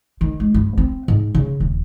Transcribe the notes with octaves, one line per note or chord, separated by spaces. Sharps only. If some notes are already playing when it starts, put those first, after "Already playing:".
D#3
G#3
G2
C4
G#2
C#3
D#1